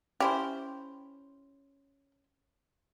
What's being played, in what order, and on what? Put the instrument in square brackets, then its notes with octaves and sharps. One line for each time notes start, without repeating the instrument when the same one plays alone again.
[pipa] C#4 E4 C5 [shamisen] G4